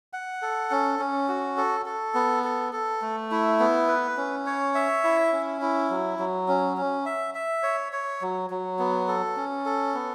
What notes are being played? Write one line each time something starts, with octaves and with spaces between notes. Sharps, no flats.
F#5
A4
C#4
C#4
F#4
A4
A4
B3
A4
A4
A3
E4
B3
B4
C#4
C#5
E5
E4
C#4
E4
F#3
F#3
C#4
C#4
E5
E5
C#5
C#5
F#3
F#3
B3
A4
C#4
A4
B3